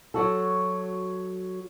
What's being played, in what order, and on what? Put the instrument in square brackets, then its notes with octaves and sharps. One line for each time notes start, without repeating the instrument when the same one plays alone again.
[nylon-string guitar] F#3 F#4 A4